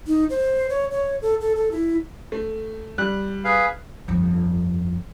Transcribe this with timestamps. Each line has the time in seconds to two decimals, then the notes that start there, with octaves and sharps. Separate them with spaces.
0.07 D#4
0.30 C5
0.70 C#5
0.92 C#5
1.22 A4
1.41 A4
1.56 A4
1.72 E4
2.32 A3
2.98 G3 F#6
3.45 G#4 B4 F5
4.08 G1 F2